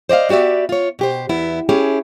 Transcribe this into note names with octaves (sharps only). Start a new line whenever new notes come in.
C5 D5 D#5 F5
B3 F#4 G4 D5 E5
F4 C#5
B2 G4 C5
E2 B3 E4
C#4 E4 G4 G#4